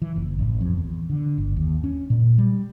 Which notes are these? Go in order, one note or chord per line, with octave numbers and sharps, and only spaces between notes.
E3
F#1
A1
F2
E2
D3
G1
D#2
C#4
A#2
G3